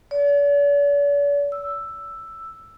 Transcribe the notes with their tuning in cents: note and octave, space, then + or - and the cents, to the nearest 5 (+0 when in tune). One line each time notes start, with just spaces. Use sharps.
D5 -45
E6 +5